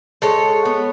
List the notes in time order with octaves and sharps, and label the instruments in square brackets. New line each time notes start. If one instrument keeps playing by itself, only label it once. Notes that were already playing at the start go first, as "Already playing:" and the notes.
[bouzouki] G#3 A4 C#5
B3